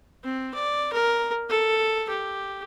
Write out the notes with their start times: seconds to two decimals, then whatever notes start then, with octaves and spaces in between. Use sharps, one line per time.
0.24 C4
0.54 D5
0.93 A#4
1.50 A4
2.09 G4